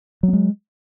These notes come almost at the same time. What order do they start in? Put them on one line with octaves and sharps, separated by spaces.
F#3 B3 G#3